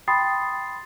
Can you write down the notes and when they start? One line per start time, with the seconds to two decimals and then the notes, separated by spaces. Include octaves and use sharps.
0.08 G5 B5 C6 D#6 A6 C7